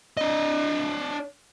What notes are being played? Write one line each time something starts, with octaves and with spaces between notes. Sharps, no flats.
D4 D#5